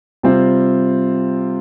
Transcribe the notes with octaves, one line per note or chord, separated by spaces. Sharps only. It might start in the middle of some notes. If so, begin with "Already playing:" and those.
C3 G3 C4 F4 C5